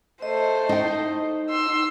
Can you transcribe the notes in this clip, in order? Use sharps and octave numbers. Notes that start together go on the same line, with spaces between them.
A3 C5 D#5
D#4 G5
C6 E6